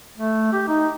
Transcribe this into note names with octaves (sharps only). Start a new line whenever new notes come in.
A3
G4
D#4